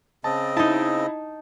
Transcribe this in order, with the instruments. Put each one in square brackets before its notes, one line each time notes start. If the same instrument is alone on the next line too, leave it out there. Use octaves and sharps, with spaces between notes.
[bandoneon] C#3 C4 D#5 [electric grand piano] A5
[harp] D#4 A5 [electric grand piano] E4